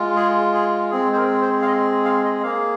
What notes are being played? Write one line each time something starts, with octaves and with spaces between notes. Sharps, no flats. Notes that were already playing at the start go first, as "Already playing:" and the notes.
Already playing: G#3 F4
G#4
G#4
G#3 C4 G#4
C5
A#4
C5
F5
D#5
F5
D#5
A#3 G#4 F5